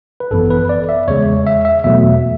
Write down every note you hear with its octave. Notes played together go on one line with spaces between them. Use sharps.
B4
G#1 F#2 E3 B3 A4
B4
D5
E5
E2 C#3 G#3 C#5
E5
E5
E2 B2 F#3 A3 E5